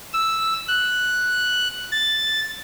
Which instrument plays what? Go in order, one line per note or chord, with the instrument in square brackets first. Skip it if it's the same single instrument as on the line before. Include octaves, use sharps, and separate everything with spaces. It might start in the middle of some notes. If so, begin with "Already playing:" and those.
[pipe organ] E6
F#6
A6